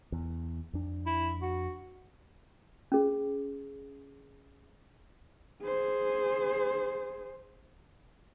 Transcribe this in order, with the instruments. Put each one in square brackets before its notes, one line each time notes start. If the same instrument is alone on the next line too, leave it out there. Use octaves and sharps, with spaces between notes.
[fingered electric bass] E2
F2 D4
[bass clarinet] E4
F#4
[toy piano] C#4 G#4
[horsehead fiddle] G#4 C5